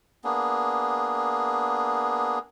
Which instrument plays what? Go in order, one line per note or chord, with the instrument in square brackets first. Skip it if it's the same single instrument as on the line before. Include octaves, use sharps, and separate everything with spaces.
[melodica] A#3 B3 D4 G#4